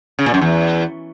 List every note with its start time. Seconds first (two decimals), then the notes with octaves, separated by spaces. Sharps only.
0.19 C#3
0.26 A#2
0.34 F#2
0.41 E2